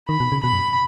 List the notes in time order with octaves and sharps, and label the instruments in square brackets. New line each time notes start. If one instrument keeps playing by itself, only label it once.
[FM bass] D#3 [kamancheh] B5
[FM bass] B2
C#3
[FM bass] B2 [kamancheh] B5
[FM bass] F#2